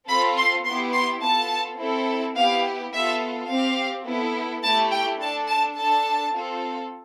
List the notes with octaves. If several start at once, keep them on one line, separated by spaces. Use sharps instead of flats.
C4 F4 A4 B5
C6
B3 E4 G4 C6
C6
B3 F4 A4 A5
C4 E4 A4
B3 E4 G4 F5
B3 F4 A4 E5
C4 G4 F5
B3 E4 A4
A3 E4 G4 A5
G5
D4 A4 A5
A5
D4 A4 A5
C4 F4 A4